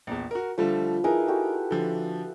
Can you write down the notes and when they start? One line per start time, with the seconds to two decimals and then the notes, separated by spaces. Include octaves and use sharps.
0.07 A#1 E2
0.31 F#4 A#4
0.58 D3 F3 G3 A3
1.04 D#4 E4 G#4 A#4 B4
1.27 F#4 G4 A4
1.71 D3 F3